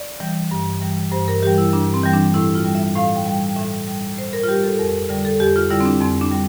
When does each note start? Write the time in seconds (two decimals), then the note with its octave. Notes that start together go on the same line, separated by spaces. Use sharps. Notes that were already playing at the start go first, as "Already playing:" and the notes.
Already playing: D5
0.20 E3 G3
0.51 G2
0.81 E3 G3
1.12 G2 C5
1.28 A#4
1.43 E3 G3 G4
1.58 E4
1.73 G2 D4
1.94 C4
2.03 E3 G3
2.13 D4
2.34 A2 E4
2.55 F4
2.65 G3
2.75 E5
2.96 A2 F5
3.16 G5
3.26 G3
3.36 G5
3.56 A2 E5
3.87 G3
4.18 A2 C5
4.33 A#4
4.43 F4
4.48 G3 G4
4.64 A4
4.79 F2 A#4
5.09 D3 G3
5.25 A4
5.40 F2 G4
5.56 F4
5.70 D3 G3 E4
5.80 C4
5.86 D4
6.01 F2 C4
6.21 D4
6.31 G3